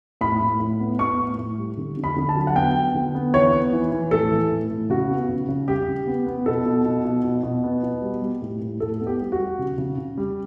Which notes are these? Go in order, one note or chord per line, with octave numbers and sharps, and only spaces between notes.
A2 B5
A2
A2
B3
B3 C#6
A2
A2
G3
D3
D3
B5
D3
A5
F#3
F#5
B3 G5
B3
D3
B3
E3 C#5
B3
E3
E3
A2 A4
E3
A2
A2
C#3 F#4
B3
C#3
C#3
G3 G4
C#3
B3
B3
B2 A4
B2
B2
B2
B2
B2
B3
B2
G3
G3
A2
A2
A2 A4
B3
G4
G3
F#4
G3
C#3
C#3
C#3
G3